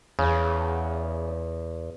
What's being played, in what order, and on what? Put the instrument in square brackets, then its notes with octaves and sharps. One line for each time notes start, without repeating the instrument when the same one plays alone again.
[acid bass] E2 [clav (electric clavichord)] C#3